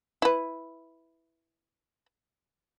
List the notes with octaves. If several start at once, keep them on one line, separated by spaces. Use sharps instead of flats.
E4 B4